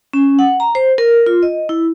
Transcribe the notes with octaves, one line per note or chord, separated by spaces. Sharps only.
C#4
F#5
A#5
C5
A#4
F4
D#5
E4